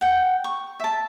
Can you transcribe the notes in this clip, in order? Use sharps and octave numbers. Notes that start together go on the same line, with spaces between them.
F#5 G5
C#6
E5 A5